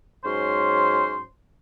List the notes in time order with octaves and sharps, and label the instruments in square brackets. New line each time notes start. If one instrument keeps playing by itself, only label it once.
[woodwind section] G#2 F#3 C#4 C5 C6